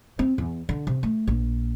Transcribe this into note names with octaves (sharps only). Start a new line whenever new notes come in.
C4
E2
D3
C3
A3
A#1